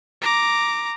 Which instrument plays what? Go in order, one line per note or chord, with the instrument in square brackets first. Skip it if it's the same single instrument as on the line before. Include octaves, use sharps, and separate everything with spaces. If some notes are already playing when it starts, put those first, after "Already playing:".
[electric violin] A#5 D6